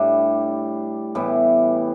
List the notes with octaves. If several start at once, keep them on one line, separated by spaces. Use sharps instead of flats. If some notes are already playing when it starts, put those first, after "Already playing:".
Already playing: A2 G3 D4
A2 E3 G3 B3